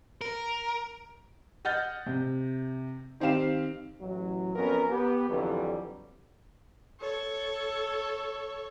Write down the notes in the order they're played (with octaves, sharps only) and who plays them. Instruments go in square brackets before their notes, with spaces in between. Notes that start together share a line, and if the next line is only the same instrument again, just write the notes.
[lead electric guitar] A#4
[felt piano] D#5 F#5 F6 G6 A6
C3
D#3 C4 G4 F5 E7
[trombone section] A1 F#3
F2 B3 C#4 A#4
B3 G4
F2 D3 E3 F#3 G3
[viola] A4 C#5